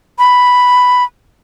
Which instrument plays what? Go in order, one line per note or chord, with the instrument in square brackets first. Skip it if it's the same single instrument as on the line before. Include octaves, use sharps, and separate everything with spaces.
[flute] B5